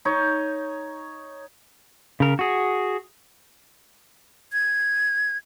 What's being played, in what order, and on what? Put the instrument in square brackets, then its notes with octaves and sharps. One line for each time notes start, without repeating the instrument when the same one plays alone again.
[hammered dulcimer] D#4 C#5
[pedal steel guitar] C#3 A#4
F#4 G#4
[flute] G#6